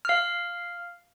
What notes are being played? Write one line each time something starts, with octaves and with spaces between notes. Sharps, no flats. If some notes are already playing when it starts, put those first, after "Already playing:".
F5 F6